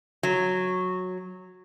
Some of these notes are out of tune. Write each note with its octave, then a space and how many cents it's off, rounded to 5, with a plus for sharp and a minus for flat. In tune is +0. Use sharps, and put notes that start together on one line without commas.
F#3 -10